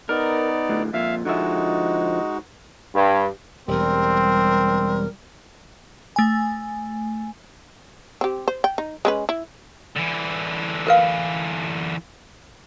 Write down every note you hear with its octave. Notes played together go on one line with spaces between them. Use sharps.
B3 D#4 A#4 D5
D2 A2
F2 A#2 E5 F5
D3 F3 G#3 D#4 F#4 E5
G2
E1 E2 G3 C4 A#4
A3 G#5
C4 G4
C5
G5
D#4
G#3 C#4 B4
E4
D3 E3
A#4 B4 F5